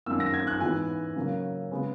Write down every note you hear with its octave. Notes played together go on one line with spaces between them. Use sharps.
F#2 D#3 A#3 E6
A#6
G#6
F#6
G#2 E3 G#3 B3 G#5
C#3 F#3 A#3 C#4
C#3 G#3 B3